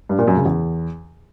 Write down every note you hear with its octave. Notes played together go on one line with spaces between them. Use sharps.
G2
A#2
F#2
C#3
E2